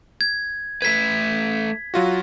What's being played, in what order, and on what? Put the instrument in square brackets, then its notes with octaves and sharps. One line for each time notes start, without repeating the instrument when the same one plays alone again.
[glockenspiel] G#6
[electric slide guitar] A3 A4 B4 [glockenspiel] G#6 B6
[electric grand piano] F#3 F4 F#4